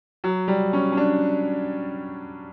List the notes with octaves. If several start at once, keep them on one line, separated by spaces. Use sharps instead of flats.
F#3
G3
C#4
C#4
D4